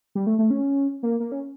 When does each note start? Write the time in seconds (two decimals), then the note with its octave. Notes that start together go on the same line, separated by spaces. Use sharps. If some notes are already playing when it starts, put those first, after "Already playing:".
0.15 G3
0.27 A3
0.39 A3
0.51 C#4
1.03 A#3
1.20 A#3
1.32 C#4